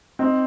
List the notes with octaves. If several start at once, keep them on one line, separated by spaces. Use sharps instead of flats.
C4 D#4